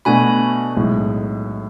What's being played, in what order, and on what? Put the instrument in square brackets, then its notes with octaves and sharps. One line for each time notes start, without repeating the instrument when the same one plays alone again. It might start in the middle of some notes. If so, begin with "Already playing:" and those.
[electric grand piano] B2 A3 D4 F#4 [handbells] G#5 B5
[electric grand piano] B1 A2 G#3